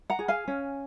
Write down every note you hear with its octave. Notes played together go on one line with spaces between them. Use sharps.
F#5 A#5
G#4
F5 G#5
C#4